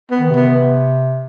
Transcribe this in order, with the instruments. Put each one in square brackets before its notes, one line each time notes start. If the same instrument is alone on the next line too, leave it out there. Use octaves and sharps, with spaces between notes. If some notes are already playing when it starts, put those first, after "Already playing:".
[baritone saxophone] B3
[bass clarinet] D#3
C3
[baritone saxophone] B3